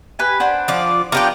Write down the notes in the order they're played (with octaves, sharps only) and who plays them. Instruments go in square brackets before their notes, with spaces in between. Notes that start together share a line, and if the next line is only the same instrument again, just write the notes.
[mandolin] G4 B4 G#5
[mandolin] D4 [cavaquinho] C5 F#5 G#5
[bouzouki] F3 F4 D5
[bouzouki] B3 D4 F4 [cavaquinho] G4 A#5 [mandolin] F5 G5